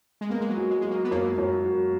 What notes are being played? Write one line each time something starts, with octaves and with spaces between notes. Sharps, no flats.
G#3
A#3 B3
G#3
F#3
F#4
G#3
G#3 F#4
A#3
B3
F#2 A#3
F#2
F#4